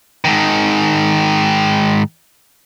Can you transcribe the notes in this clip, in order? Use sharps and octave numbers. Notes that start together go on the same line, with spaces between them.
G#2 D#3